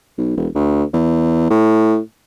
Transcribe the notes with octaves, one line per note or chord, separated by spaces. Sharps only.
B1
E1
D2
E2
A2